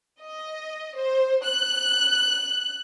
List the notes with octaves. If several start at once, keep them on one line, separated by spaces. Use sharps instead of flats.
D#5
C5
F#6